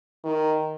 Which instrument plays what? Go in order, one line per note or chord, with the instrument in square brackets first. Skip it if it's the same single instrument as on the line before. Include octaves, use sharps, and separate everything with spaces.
[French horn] D#3